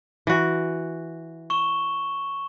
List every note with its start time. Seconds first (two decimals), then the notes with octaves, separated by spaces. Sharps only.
0.27 E3 F#4
1.50 C#6 E7 G7